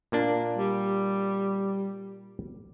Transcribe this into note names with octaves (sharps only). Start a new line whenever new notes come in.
A#2 A#3 D4
G3